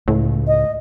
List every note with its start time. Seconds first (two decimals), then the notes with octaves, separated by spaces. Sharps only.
0.08 C#2 A2
0.47 D#5